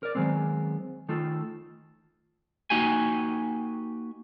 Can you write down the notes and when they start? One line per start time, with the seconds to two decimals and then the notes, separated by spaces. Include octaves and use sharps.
0.03 A#4 D5
0.15 D#3 F#3 G#3 B3 C4
1.09 D#3 A3 F4 A4
2.70 A#3 D#4 F#4 G4 G#5